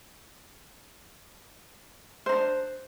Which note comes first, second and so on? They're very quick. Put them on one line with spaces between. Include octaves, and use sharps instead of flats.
C5 D#4 D4